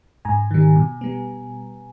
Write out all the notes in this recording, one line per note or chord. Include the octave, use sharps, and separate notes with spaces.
G#2 G#5 A#5
D#3 G3
B2
G3 B3